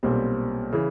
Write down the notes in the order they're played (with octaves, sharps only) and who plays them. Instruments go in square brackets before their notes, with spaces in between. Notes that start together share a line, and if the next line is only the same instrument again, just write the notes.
[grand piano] B1 A#2 G3 C4
C#3 E3